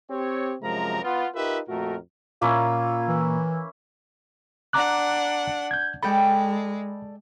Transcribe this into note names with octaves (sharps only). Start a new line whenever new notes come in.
C4 G4 C#5
F#2 C3 F3 G#3 A#4 A#5
B3 F4
D#4 F4 G4 A#4 B4 E5
F2 A#2 A3 F#4 A#4
A#2 A#3 C#4 E4 F4
E3
D4 F#5 A#5 D6 F#6
G6 G#6
G#3 A4 D5 G5 B5